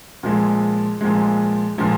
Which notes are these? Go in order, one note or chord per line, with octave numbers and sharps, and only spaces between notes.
A#2 F3 G#3
A#2 F3 G#3
A#2 F3 G#3